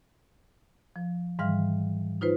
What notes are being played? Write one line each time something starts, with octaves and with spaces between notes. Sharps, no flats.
F3
G#2 D#3 E3 G3 F5 F6
D#4 F4 B4 C5